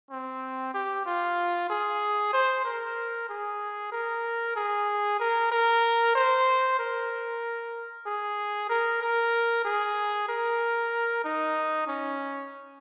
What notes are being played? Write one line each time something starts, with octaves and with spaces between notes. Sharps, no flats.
C4
G4
F4
G#4
C5
A#4
G#4
A#4
G#4
A#4
A#4
C5
A#4
G#4
A#4
A#4
G#4
A#4
D#4
C#4